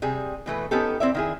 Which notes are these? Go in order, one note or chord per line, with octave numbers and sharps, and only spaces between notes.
C3 G3 G#4
B2 E3 A3 B4
B3 C#4 D#4 G4 A4
C4 E4 D5 E5
D#3 E4 G#4